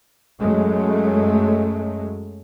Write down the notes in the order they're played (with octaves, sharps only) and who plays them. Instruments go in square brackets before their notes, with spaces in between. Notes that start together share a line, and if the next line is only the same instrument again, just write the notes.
[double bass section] F#2 F#3 G#3 A3